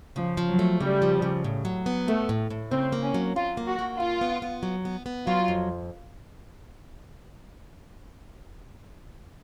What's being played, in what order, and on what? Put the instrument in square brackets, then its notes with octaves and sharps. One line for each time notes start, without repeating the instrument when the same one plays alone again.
[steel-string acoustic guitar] C#3 [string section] F3
[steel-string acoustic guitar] F3
[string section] F#3
[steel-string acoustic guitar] A3
[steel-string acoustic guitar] C#3 [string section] G3
[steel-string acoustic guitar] F3
C#3
A2
F#3
B3
[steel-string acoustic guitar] A2 [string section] A3
[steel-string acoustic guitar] A2
A2
[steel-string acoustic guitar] C#3 [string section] C4
[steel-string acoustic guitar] A#3
[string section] C#4
[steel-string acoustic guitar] F#3
[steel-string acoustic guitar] F#3 [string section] F4
[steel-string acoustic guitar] A#3
[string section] F#4
[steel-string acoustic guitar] A#3
[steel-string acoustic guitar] C#3 [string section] F4
[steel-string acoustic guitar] B3
B3
F#3
B3
B3
[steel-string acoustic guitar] F#3 [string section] F4
[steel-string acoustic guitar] F2